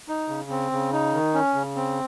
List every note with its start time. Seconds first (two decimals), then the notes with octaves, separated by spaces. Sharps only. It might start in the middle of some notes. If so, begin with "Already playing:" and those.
0.08 D#4
0.28 C#3
0.50 C4
0.72 C#3
0.93 D#4
1.13 D#3
1.34 C#4
1.54 C#3
1.76 C4